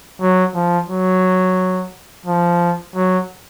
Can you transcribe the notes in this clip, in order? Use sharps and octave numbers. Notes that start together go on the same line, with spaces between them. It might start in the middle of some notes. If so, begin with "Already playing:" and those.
F#3
F3
F#3
F3
F#3